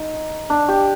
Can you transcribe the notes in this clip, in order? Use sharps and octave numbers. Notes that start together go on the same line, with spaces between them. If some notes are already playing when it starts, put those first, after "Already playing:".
Already playing: D#4
D4
G4